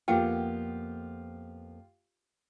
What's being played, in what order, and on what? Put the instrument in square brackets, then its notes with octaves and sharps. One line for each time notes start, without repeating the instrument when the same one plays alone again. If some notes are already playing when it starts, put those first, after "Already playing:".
[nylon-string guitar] F2 A#3 B3 [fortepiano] F4 G4 [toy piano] F#5 G5